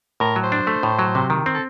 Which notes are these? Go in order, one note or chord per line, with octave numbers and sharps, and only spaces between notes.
A2 A#4
F#3
C5
D4
A3
A2
F#3
C3
D#3
C4
A4